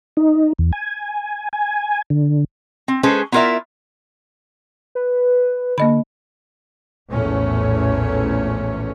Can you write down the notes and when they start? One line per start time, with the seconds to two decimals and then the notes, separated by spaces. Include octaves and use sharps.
0.17 D#4
0.59 E2
0.73 G#5
1.53 G#5
2.10 D3
2.88 C4
3.03 G#3 C#4 G#4 A4 B4 C5
3.32 B3 E4 F4 A#4 D5 E5
4.95 B4
5.78 D3 A#3 D#5 B5
7.11 A#1 E2 A2 A3 C#4